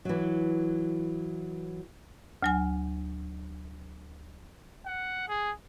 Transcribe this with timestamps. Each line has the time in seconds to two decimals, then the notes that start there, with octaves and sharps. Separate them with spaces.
0.05 E3 F#3
2.43 D2 F#3 G#5
4.86 F#5
5.29 G#4